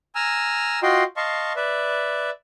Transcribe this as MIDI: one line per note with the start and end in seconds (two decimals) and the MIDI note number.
0.15 0.80 80
0.15 0.80 82
0.15 0.80 88
0.15 0.80 89
0.83 1.03 65
0.83 1.03 66
0.83 1.03 75
0.83 1.03 79
0.83 1.03 84
1.17 1.53 75
1.17 1.53 77
1.17 1.53 81
1.17 1.53 84
1.17 1.53 85
1.56 2.30 71
1.56 2.30 74
1.56 2.30 76